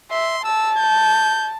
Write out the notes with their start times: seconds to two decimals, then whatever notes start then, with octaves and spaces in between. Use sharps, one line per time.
0.11 E5 C6
0.44 A5 E6
0.78 G6